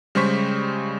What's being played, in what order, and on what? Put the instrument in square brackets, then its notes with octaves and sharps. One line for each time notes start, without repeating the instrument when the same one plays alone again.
[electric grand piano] C#3 G3 G#3 C5 C#6 B6